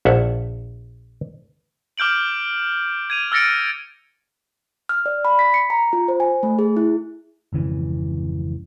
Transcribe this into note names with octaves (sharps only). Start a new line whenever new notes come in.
A#1 E5 F#5
D6 F6 G6 D7 F#7
G#6 D#7 F7
E6 F6 A6 A#6 C#7 D7
F6
D5
B5
B6
C#7
A#5
F4
C5
G#5
A3
G#4
E4
G#1 F2 C#3 E3